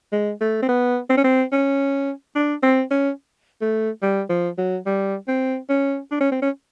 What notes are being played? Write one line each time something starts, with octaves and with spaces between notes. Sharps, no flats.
G#3
A3
C4
B3
C4
C#4
C4
C#4
D4
C4
C#4
A3
G3
F3
F#3
G3
C4
C#4
D4
C#4
C4
C#4